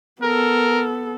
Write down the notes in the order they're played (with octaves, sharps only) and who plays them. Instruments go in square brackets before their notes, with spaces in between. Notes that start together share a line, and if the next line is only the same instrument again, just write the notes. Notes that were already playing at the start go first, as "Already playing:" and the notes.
[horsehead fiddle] B3 A4 [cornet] A#4